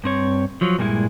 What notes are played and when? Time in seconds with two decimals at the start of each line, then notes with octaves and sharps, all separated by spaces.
0.04 G2 C4 C#5
0.61 F3 F#3
0.79 G2 A#2 G3 G#3 E4